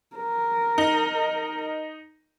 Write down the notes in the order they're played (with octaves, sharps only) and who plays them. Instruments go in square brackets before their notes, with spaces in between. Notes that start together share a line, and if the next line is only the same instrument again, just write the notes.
[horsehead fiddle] A#4
[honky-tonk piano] D#4